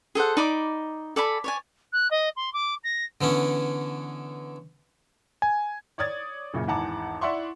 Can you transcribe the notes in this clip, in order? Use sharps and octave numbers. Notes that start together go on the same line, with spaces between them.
G#4 A4 C5 F#5
D#4 D5 B5 D6
A4 D5 G#5 B5
C#5 D5 G#5
F#6
D#5
C6
D6
A#6
D3 E3 B3 C#4
G#5
C#5 D5 D#6 G#6 A6
F#2 A#2 C#3
G#1 E2 F#5 A5 A#5 D6
E4 D5 E5 F#5 C6 C#6